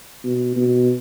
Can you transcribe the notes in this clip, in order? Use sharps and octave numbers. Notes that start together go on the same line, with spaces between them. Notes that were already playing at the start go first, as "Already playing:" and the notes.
B2
B2